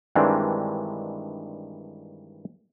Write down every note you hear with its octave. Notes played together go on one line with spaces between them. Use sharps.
G2 D#3 E3 G#3 C4 D4